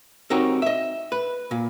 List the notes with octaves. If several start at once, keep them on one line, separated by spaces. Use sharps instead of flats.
C4 D#4 F#4 G4 A#4 C#5
D#5 E5
B4
A#2